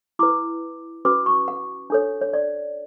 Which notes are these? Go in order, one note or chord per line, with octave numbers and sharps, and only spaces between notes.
E4 B4 D6
C#4 F#4 B4 D6
C#6
F#5
D4 A4 C#5
C#5
D5